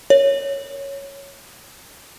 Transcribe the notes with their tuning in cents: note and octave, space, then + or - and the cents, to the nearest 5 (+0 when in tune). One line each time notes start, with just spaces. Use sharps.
A#4 +0 C#5 +0